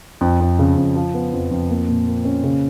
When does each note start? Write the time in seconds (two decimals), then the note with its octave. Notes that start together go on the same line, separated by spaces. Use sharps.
0.21 F2
0.41 F2
0.59 C#3
0.77 F2
0.95 F3
1.14 B3
1.33 F2
1.51 F2
1.70 A#3
1.89 A#2
2.07 A#3
2.25 C#4
2.44 C#3